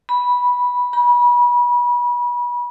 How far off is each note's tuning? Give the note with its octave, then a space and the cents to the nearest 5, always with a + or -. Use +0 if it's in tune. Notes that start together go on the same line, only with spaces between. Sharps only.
B5 -10
B5 -30